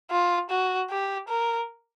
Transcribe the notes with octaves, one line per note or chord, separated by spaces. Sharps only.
F4
F#4
G4
A#4